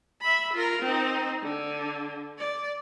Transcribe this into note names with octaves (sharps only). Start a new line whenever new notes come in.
E5 B5
F4 A#4
C4 D#4
D3
D5